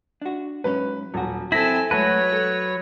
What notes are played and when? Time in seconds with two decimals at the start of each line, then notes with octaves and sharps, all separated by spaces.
0.22 D4 F#4
0.64 G#2 F#3 C#4 B4
1.14 D#1 F#3 F#4
1.52 C4 E4 A4 G#5 A#6 B6
1.91 F#3 G#3 A3 F#4 B4 C#5 A5
2.33 A4